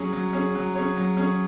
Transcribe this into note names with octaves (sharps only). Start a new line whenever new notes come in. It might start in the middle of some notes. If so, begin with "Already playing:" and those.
Already playing: F#3 C#4 G#4 C#5
F#3
C#4 G#4 C#5
F#3
C#4 G#4 C#5
F#3
C#4 G#4 C#5